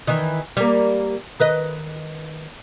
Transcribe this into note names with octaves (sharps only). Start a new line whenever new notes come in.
D#3 E3
G3 A#3
D#3 B4 D#5